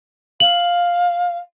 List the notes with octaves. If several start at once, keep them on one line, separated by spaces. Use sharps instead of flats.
F5 F#7